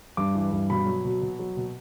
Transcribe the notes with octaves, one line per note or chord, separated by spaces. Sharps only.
G2 D6
E3
G2
B2 B5
F#3
B2
B2
F#3
B2